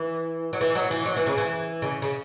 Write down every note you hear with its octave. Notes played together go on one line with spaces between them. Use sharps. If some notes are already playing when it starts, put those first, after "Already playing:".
Already playing: E3
F#3
E3
F#3
E3
F#3
E3
C#3
E3
C#3
C#3